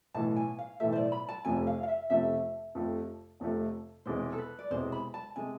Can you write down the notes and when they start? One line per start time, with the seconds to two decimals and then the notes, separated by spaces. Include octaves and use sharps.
0.14 B1 A2 E3 A3 A5
0.36 G#5
0.59 F5
0.80 B1 A2 E3 A3 E5
0.92 C5
0.96 D5
1.12 B5
1.29 A5
1.45 F1 F2 C3 F3 A3 G#5
1.67 F5
1.83 F5
1.88 E5
2.10 F1 F2 C3 F3 A3 E5
2.75 F1 F2 C3 F3 A3
3.40 F1 F2 C3 F3 A3
4.05 E1 E2 C3 G#3 C5
4.32 A4
4.38 B4
4.59 D5
4.71 E1 E2 C3 G#3 C5
4.92 B5
5.14 A5
5.36 C3 G#3 G#5